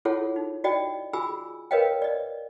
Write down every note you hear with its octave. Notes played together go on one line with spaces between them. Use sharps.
E4 F4 G#4 A4 C#5 F#5
D#4
F#4 D5 D#5 G5
F4 F#4 G#4 G#5 B5 E6
A#4 B4 C#5 D#5 F5 G5
D5 D#5